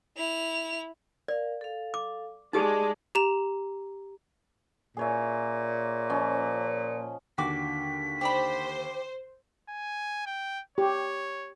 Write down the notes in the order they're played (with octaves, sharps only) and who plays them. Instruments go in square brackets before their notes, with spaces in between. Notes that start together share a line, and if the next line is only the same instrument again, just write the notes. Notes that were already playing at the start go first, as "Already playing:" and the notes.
[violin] E4 F7
[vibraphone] A#4 F5 [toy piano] D5
[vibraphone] A4 F5
[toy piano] D6
[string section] G#3 [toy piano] D#4 G4 G#4 [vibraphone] D5 A5 D6
[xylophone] G4 A#5 E7
[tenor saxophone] A#2 [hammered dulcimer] G#4 C#5 E5
[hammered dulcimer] F3 C#4 D#5
[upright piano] D#2 D3 G5 [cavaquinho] F#4 D6 [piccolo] B6
[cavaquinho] G4 D5 B5 [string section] C5
[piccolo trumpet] G#5
G5
[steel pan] G4 [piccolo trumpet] C#5